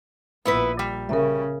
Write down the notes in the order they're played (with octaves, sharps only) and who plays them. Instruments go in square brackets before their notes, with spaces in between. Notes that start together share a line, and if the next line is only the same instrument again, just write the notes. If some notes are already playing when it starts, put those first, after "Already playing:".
[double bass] A#1 [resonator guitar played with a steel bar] B3 E4 B4
[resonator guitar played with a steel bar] G3
[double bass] C#3 [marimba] A#4 E5